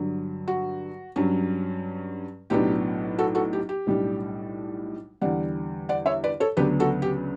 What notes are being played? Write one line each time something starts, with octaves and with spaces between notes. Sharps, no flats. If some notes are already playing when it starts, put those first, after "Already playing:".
Already playing: G2 D3 F#3
F#4
G2 F#3 C#4
B1 A2 F#3 B3 D4 G4
F#4 A4
F#4 A4
G4
G4
B1 A2 G3 D4
E2 D3 G3 D5 F#5
D5 F#5
C#5 E5
B4 D5
A4 C#5
D2 C#3 F#3 B3 D4 G4 B4
F#4 A4
G4